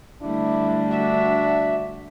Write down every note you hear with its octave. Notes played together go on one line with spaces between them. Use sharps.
D3 G3 A3 D4 E4
F#4 E5